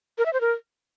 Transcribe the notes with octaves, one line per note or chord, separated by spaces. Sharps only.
A#4
E5
C5
A#4